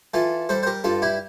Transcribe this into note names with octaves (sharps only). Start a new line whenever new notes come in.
E3 F4 A4
G3 A4 C5
C5
G4 A#4
G2 F4 A4
E4 G4